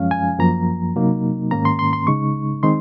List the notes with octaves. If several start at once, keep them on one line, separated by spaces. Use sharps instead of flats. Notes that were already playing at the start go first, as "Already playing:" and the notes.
Already playing: F#2 F3 G#3 C#4 F5
G#5
F#2 F3 A#3 A#5
C3 F#3 A#3 D#4
G#2 D#3 A#3 C#4 A#5
C6
C6
C6
C#3 G#3 D#4 C#6
D#3 G#3 C4 D#4 C6